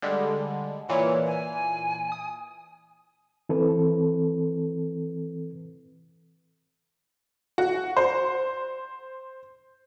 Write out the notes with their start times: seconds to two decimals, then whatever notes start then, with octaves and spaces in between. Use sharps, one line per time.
0.02 D3 G3 G#3
0.89 A#2 E3 C#5
1.27 G#5
2.12 D#6
3.49 E3 C4 A4 B4
7.58 F#4
7.97 C5